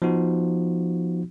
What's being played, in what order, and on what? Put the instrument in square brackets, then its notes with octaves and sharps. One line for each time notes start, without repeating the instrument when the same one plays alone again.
[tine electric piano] F3 B3 D#4 F#4